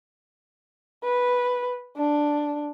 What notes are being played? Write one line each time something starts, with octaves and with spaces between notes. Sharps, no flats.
B4
D4